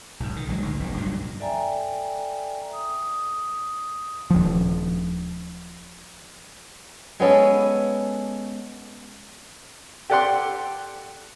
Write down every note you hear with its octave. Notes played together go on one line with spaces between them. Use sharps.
B1 G#2
D#3
A#1 F#3 G#3
D2 G#2
F1 B1 G#2
G2 A#2 F3 F#3
A4 D5 E5 G5 G#5 A#5
D#6
D#1 F3
G#3 B3 C#4 A4
G4 A4 D5 F#5 G5 C6